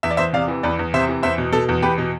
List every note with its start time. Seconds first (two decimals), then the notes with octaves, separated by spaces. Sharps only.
0.03 E2 E5
0.11 D5
0.17 E2 C5 E5
0.33 C3 D5 F5
0.48 E3
0.63 E2 B4 D5
0.79 E2
0.93 C3 C5 E5
1.09 E3
1.23 E2 C5 E5
1.38 B2
1.53 B2 A4
1.69 E2
1.82 E2 G4 B4
1.98 B2